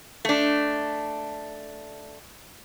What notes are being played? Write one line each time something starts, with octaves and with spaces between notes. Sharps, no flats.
A3 D4